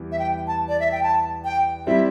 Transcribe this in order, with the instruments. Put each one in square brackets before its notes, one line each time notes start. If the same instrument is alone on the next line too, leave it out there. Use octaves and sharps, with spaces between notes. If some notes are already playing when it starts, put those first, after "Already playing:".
Already playing: [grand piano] E2 E3 G3
[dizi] E5
G5
A5
D5
E5
G5
A5
G5
[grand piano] G3 C4 E4 [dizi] E5